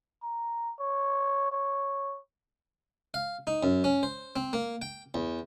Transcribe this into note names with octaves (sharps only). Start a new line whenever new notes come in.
A#5
C#5
C#5
F5
D#4
F#2
C#4
C5
C4
A#3
G5
E2